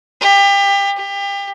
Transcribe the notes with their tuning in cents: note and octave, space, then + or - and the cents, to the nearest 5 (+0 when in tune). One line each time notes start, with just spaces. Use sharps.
G4 +30
G4 +30